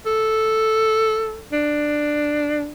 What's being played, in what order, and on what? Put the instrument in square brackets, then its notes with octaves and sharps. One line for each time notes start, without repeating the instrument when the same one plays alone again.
[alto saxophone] A4
D4